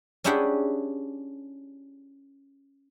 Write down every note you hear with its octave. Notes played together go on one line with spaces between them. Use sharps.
C#4 D4 E4 G4 G#4 F#5